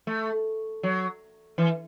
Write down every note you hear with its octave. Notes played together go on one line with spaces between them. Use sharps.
A3
F#3
E3